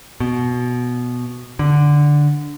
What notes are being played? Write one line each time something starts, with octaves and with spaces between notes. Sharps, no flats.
B2
D3